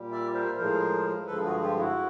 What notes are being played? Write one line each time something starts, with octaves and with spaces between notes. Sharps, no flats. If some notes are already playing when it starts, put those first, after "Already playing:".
Already playing: A#2 G3
D5 E5
A#4 C5
A2 F3 G#3 A#4 C5
G2 D3 F3 G#3 A4 B4
F#4 G#4
F4 G4
E4 F#4